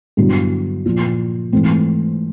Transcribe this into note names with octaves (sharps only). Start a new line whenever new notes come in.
G2 D3 F#3 B3 E4
A#2 F3 A#3
G#2 E3 A3 C4